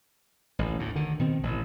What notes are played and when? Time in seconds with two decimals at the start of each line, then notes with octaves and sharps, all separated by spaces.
0.59 A1
0.79 D2 A2
0.95 D3 D#3
1.19 B2 D#3 C4
1.43 A1